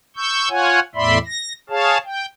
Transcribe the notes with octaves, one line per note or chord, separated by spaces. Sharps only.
C#6 E6 G6
F4 C#5 F#5 G#5
E2 A2 D5 E5 B5 C6
A#6
G#4 C#5 F5 A5
G5